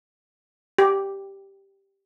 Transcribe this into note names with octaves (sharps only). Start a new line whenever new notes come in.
G4